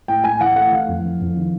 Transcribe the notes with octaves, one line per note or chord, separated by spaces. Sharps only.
A2 G5
A2 G#5
E3 F#5
A3 F#5
E3 F5
F2
E3
F2
D#3